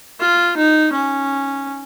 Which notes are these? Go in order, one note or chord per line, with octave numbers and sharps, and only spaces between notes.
F4
D#4
C#4